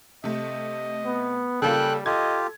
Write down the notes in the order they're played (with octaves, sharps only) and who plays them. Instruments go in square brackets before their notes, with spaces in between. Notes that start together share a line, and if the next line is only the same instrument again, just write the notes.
[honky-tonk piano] C3 A3 [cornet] D#5
[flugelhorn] B3
[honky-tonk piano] C#3 A#3 F4 [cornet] G3 [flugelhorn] A4 [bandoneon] G5 F#6
[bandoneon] F4 G4 [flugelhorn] A4 [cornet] D#5 [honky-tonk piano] G#6